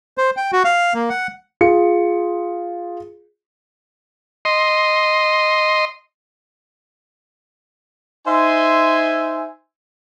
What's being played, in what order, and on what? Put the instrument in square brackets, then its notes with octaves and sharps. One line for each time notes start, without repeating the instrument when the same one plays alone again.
[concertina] C5
G5
F#4
F5
A#3
F#5
[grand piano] F4 G#4 C#7
[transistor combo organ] D#5 C6
[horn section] D#4 C5 E5 G#5 C6